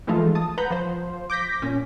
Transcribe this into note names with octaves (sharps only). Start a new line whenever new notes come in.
E3 F3 G#3 A3 D#4 F4
A5 D#6
B4 F#5 A#5 B5 G6
F3 C5
D6 G6 A#6 B6
A#2 C#4